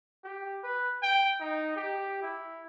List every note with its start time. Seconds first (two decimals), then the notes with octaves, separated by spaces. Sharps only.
0.24 G4
0.64 B4
1.03 G5
1.40 D#4
1.76 G4
2.23 E4